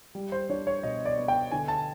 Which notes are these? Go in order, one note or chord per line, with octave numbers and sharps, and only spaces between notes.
G3
C5
D4 C#5
C#5
B2 D#5
D5
B3
G5
D3 G#5
A5